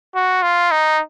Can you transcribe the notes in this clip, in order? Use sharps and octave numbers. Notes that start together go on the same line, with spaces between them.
F#4
F4
D#4